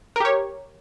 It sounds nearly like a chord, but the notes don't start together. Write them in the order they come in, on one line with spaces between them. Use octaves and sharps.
A#4 G4 C#5